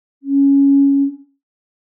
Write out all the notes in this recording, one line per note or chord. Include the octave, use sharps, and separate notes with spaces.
C#4